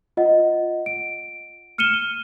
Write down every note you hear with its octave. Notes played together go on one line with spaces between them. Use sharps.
F4 D#5 F#5
D7
F6 C#7 D#7 E7 G7